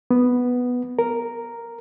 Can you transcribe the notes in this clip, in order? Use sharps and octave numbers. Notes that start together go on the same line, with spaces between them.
B3
A#4